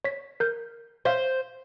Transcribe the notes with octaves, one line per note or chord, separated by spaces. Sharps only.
C#5 B6
A#4 G6
C5 C#5 E5 F5